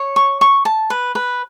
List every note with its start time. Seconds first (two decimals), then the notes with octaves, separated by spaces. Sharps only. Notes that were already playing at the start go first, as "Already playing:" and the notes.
Already playing: C#5
0.16 C#6
0.41 C#6
0.65 A5
0.90 B4
1.15 B4